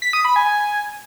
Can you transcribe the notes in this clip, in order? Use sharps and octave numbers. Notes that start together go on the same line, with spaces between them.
B6
D#6
B5
G#5